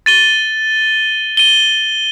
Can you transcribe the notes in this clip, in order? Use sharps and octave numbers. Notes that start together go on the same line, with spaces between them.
A6 D#7 G7
D#7 G7